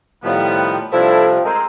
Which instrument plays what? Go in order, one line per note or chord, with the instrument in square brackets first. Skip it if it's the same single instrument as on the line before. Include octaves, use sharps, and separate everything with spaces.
[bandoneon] A2 D#3 G3 [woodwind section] F3 B3
[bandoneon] C3 G3 [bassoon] F3 [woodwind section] A3 D4 E4
[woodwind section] G#3 C4 [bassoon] A#4